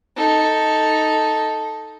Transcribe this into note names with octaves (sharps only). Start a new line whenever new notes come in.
D#4 A4